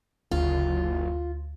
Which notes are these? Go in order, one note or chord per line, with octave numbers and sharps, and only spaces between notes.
F#1 D2 F4